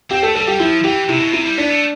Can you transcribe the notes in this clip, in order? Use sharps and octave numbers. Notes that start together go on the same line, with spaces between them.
C4 G4
A3 A4
G3 A4
G3 G4
F3 E4
E3 G4
C3 E4
B2
C3 E4
G3
B3 D4
A3